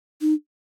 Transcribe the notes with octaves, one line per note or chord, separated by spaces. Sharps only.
D#4